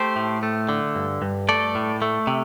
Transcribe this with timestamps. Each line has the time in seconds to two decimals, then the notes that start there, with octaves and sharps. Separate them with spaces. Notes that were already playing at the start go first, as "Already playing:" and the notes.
Already playing: A3 G4 C5
0.16 A2
0.43 A3
0.69 D3
0.95 G2
1.22 G2
1.49 A3 A4 D5
1.75 A2
2.02 A3
2.27 C3